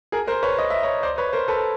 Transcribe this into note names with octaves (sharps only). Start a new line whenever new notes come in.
G#4 A#4
A#4 C5
B4 C#5
D#5
E5
C#5 D#5
C5 D5
B4 C#5
A#4 C5
A4 B4